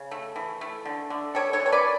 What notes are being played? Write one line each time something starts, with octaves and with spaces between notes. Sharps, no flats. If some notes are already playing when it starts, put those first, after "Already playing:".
Already playing: C#3
A3
E3
A3
D3
D3
G3 A4 C#5
A4 C#5
E3
C#5
B4 D5